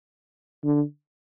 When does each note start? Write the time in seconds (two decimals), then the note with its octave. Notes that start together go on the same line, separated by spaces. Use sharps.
0.64 D3